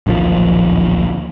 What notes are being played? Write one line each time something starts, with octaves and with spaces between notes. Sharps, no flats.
D1 A#1 D#2 F3